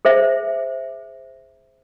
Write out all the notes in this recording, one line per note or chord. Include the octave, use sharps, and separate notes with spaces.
G#4 C5 E5